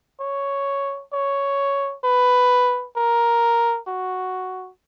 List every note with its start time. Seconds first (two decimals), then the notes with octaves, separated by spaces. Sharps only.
0.20 C#5
1.13 C#5
2.04 B4
2.96 A#4
3.87 F#4